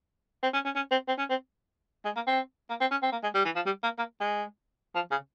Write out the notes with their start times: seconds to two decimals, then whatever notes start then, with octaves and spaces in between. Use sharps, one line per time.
0.43 C4
0.54 C#4
0.65 C#4
0.75 C#4
0.91 C4
1.08 C4
1.18 C#4
1.30 C4
2.05 G#3
2.16 A#3
2.27 C4
2.70 A#3
2.81 C4
2.91 C#4
3.02 C4
3.12 A#3
3.23 G#3
3.35 G3
3.45 E3
3.56 F3
3.66 G3
3.83 A#3
3.98 A#3
4.20 G#3
4.95 F3
5.11 C#3